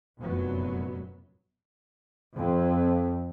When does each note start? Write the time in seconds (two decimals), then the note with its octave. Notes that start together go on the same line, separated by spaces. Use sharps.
0.19 F1 F#2 A#2 F#3 B3
2.35 F2